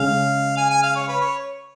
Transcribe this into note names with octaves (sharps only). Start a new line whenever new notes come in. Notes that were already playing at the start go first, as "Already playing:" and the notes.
Already playing: C#3 G#3 C#4 F5
G#5
G#5
F5
C#5
B4
C#5